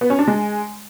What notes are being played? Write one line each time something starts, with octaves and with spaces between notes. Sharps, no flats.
B3
C#4
D4
G#3